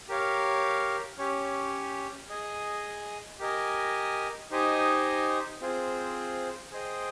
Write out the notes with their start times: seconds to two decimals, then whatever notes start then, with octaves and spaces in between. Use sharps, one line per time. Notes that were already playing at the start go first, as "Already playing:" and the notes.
0.08 G4 A#4 C#5 F5
1.18 C#4 G4 C#5
2.29 G#4 D#5 G#5
3.39 G4 A#4 D#5 G#5
4.51 D#4 G4 C5 D#5 G#5
5.60 C4 F4 G#4 C5
6.71 G#4 C5 D#5 G5